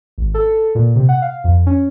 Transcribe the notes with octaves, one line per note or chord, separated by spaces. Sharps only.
G#1
A4
A#2
C3
F#5
F5
F2
C#4